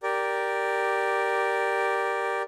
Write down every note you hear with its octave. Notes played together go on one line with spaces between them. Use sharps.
G4 A#4 D5